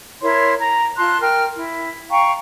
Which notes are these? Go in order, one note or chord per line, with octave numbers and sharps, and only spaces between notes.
E4 A#4 C#5 C6
A#5
F4 A5 C6 F#6
A#4 G5 F6
E4
F5 G5 A#5 C#6